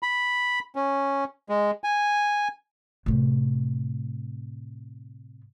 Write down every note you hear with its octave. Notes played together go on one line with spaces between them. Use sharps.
B5
C#4
G#3
G#5
A2 C3